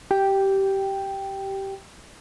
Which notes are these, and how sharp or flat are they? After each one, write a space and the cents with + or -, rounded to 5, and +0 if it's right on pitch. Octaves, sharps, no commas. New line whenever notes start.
G4 -15 G5 +0